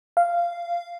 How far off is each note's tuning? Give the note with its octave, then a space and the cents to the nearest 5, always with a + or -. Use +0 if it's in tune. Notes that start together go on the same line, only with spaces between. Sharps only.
F5 -15